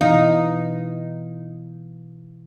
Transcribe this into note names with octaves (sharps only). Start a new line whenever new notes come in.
B2 E3 D#4 F5